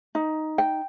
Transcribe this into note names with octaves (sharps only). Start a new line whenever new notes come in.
D#4
G5